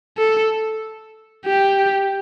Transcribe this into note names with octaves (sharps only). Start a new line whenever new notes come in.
A4
G4